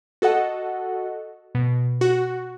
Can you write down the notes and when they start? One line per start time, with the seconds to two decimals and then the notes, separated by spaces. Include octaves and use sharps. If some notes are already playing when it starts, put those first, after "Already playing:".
0.22 F#4 A4 D#5 F#5
1.55 B2
2.01 F#4